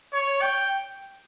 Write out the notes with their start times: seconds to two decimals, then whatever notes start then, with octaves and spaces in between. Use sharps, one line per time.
0.13 C#5
0.42 G5